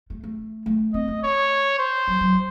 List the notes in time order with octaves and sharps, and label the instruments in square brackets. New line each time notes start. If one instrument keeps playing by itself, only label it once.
[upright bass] A3
A3
A3
[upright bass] C4 [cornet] D#5
[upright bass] A3
[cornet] C#5
C5
[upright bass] F#3
F#3